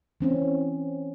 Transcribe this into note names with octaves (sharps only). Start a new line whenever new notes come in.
E3 C4 C#4